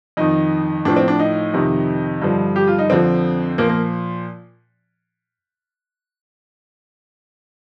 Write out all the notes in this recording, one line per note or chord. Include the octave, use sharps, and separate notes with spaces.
F2 D#3 D#4
A2 F3 D4
C4
D4
D#4
F2 C3 D#3
G2 D3 F3
G4
F4
D#4
F2 D3 F3 C4
A#2 F3 A#3
A#3